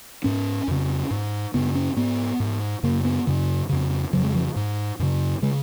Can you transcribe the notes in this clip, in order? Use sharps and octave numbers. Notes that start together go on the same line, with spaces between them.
G#2 C#4
F2 C#3
G#2
F#2 C#3 B3
C#4
G#2 B3
G#2
F#2 C#3 A#3
B3
F#2 C#3
F2 C#3
F2 C#3 F#3
G#3
F3
G#2
F#2 C#3
C#3 G#3